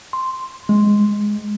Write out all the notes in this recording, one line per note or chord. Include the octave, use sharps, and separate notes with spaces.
C6
G#3